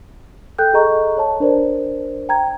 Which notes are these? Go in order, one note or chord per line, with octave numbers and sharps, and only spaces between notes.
A4 G5 F#6 G6
G#4 A4 D#5 A#5 C#6
C#5 A5
D4 A#4 C5 D5
G5 A#5 G#6